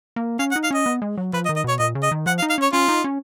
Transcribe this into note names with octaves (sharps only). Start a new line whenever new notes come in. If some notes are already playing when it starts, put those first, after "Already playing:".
A#3
C#4 F5
F#5
D#4
F5
C#4 D#5
B3
G#3
F#3
F3 B4
D#5
D#3
D#5
B2 C#5
A#2 D#5
C#3
D#5
D#3
F3 F#5
F5
D#4
F5
C#4 C#5
C#4 F4
D#4
C#4